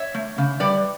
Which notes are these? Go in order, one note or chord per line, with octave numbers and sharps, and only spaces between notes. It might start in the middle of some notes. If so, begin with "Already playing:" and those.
Already playing: C#5 E5
A3
C#3
G3 B4 D5